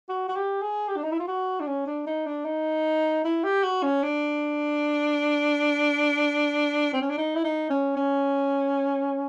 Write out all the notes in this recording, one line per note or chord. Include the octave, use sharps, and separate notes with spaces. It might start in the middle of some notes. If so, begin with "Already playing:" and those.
F#4
F#4
G4
G#4
G4
D4
D#4
E4
F4
F#4
D4
C#4
D4
D#4
D4
D#4
E4
G4
F#4
C#4
D4
C4
C#4
D4
D#4
E4
D#4
C#4
C#4